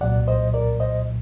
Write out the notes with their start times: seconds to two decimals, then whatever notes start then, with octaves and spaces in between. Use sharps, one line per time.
0.01 C2 A#2 F#3 D5 F#5
0.27 C5 D#5
0.54 A#4 D5
0.80 C5 D#5